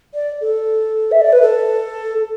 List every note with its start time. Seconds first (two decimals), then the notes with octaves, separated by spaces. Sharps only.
0.14 D5
0.41 A4
1.11 E5
1.21 D5
1.32 B4
1.42 A4